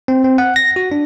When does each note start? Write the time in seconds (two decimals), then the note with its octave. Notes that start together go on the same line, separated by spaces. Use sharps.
0.08 C4
0.24 C4
0.38 F#5
0.56 A#6
0.76 F#4
0.92 D4